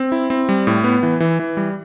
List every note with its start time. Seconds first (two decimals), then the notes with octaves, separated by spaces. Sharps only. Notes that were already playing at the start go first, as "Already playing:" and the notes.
Already playing: C4
0.12 E4
0.30 C4
0.49 G3
0.67 A2
0.84 B3
1.03 E3
1.20 E3
1.39 E3
1.57 G3